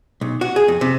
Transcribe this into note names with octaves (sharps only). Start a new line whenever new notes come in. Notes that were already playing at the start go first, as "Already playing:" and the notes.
B1
F#4
G#4
F2
C3